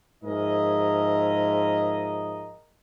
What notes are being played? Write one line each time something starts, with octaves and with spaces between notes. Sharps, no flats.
G#2 F3 G#4 A#4 D#5 E5